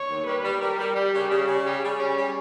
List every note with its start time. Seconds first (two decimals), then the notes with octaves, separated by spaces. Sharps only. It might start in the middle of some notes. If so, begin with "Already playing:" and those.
Already playing: C#5
0.09 D#2
0.26 G3 B4
0.44 G3
0.61 G3 A#4
0.79 G3
0.95 G3 G4
1.13 C#3
1.30 C#3
1.47 C#3
1.65 G3 G#4
1.82 G3
1.99 C#4
2.16 G3